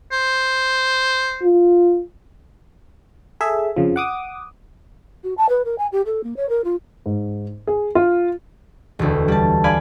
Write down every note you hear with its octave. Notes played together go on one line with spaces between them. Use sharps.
C5
F4
G#4 A4 E5
F2 C#3 F3
F#5 D6 D#6
F#4
A5
B4
A#4
G#5
G4
A4
A#3
C#5
A#4
F4
G#2
G#4
F4
E1 D2
G3 A5
D5 F5 G#5 B5